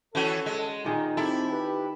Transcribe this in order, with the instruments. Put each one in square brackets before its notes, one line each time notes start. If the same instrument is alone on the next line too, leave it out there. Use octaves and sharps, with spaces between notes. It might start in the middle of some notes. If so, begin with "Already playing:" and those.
[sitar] E3 C#4 F#4 [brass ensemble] A4
[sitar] G#3
[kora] A#2 D#3 G#4 [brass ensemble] D#4
[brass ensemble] C4 G4 [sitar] E4 [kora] A4
[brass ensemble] G4 B4